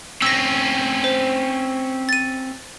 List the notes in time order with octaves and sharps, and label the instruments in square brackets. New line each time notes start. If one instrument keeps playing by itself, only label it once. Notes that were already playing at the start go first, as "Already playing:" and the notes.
[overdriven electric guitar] C4 C#4 [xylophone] E6 A#6
[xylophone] C5
A6 D#7